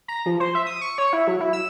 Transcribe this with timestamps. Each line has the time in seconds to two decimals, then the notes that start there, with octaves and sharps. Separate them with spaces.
0.08 A#5
0.26 F3
0.40 C5
0.55 E5
0.66 D#6
0.81 C#6
0.98 C#5
1.13 E4
1.27 F#3
1.40 E4
1.53 E6